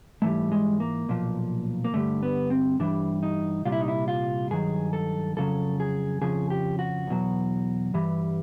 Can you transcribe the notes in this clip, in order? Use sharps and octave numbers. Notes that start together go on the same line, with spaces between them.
G#2 E3 G3 A3
G#3
A#3
B1 A#2 F3
A#3
G2 D3 G3 A3
B3
C4
G2 E3 G3 D4
D#4
C2 A#2 G3 F4
E4
D#4
E4
F4
G2 D#3 F#3 G#4
A4
F2 C#3 F#3 A4
G#4
F2 C#3 F3 G#4
G4
F#4
E2 B2 F#3
G2 E3 G3